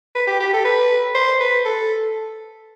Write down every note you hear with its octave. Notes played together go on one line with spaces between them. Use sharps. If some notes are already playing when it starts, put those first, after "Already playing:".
B4
G4
G4
A4
B4
C5
B4
A4